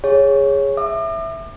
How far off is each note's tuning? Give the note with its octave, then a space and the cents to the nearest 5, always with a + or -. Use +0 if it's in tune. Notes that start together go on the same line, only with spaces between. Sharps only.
G#4 -15 C#5 +0
E5 +0 D6 +40